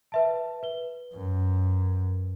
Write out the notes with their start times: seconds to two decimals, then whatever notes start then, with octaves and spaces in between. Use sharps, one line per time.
0.12 B4 E5 A5
0.63 B4 G7
1.13 F#2